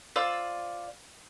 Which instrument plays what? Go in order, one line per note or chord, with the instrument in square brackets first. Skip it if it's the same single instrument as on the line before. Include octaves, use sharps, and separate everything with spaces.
[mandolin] F4 C5 D5 E6